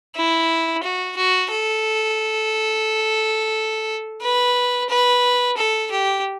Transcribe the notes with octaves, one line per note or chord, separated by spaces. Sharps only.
E4
F#4
F#4
A4
B4
B4
A4
G4